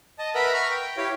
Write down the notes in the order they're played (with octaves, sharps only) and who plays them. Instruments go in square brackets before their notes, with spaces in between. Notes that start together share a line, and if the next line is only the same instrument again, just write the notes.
[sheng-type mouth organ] D#5 A5
A#4 B4 E5 F#5 A#5 B5
A#5 B5 C#6 F6
G5
E4 G4 C#5 F5